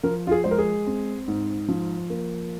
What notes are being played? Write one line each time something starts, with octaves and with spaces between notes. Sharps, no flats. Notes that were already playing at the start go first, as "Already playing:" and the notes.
F3 A#4
F4
G#4
G#3 C5
A#4
G#4
C4
G#2
F3
A#3